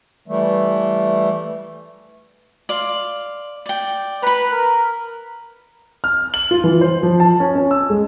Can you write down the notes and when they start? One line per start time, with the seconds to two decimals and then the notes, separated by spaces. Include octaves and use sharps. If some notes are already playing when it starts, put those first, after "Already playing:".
0.28 E3 G3 A3
2.69 D5 F5 C6
3.66 D5 G5
4.23 B4 A#5 B5
4.51 A#4
6.04 F6
6.34 F#7
6.51 F4
6.64 E3
6.81 C5
7.03 F3
7.20 A5
7.40 C#4
7.55 C#4
7.71 E6
7.90 G#3